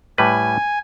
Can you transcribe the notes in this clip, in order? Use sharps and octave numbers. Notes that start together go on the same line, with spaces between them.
A2 G3 B4 G#5